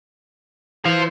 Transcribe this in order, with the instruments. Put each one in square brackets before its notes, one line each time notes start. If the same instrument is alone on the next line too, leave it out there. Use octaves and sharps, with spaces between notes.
[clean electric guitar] E3 [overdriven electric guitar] C5 F5